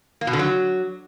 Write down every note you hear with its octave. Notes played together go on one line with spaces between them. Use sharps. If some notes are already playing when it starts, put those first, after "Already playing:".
A#3
B2
D3
F#3